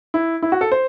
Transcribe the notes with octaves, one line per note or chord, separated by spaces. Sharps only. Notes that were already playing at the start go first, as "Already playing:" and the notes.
E4
E4
F#4
A4
C5